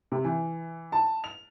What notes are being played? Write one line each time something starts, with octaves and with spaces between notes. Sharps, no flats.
C3
E3
A5
F7